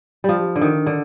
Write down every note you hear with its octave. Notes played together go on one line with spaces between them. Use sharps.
F3 G3
D3
D#3
D3